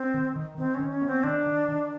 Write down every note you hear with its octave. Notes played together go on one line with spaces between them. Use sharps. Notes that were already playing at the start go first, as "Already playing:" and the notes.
Already playing: C4
D#3
D#3
D#3 C4
C#4
D#3
C#4
B3
C4
D#3 D4
D#3
D#3